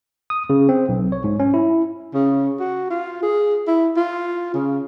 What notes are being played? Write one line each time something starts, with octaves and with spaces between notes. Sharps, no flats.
D#6
C#3
C4
B1
C#5
G#2
C#4
E4
C#3
F#4
F4
G#4
E4
F4
C#3